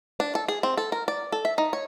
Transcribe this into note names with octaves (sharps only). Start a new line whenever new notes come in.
D4
A4
G#4
C4
A4
A#4
D5
A4
E5
D#4
C#5